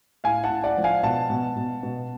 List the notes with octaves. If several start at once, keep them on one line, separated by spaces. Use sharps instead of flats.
A2 F5 G#5
F#5 A5
A2
D5 F#5
F3
F5 G#5
B2 F#5 A5
B2
B2
B2